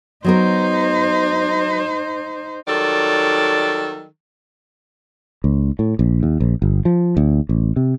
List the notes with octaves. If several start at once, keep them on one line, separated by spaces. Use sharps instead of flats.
F#3 B3 D#4 A#4 C5
D#3 F#3 G3 A4 D5
C#2
A2
A#1
D#2
A#1
G1
F3
D2
A1
C3